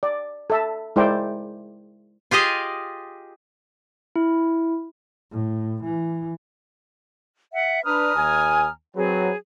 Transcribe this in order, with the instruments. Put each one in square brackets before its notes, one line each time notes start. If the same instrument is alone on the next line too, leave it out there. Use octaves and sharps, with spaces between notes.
[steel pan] D5
A4 E5 A5
G#3 E4 A#4 C5 D5 G5
[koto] F4 G4 G#4 D#5 F5
[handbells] E4
[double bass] A2
E3
[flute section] E5 F#5
[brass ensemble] D4 B4 [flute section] A#5 D#6 F6
[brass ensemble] D#2 G#5
[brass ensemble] F#3 C4 B4 [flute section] G#4